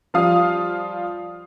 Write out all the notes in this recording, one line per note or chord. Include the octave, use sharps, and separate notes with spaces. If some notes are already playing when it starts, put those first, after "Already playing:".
F3 G3 F4 F5 D#6